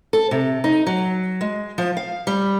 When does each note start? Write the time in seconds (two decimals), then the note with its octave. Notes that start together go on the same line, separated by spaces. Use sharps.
0.13 A4
0.31 C3
0.64 D#4
0.87 F#3
1.41 G#3
1.78 F3
1.97 F5
2.27 G3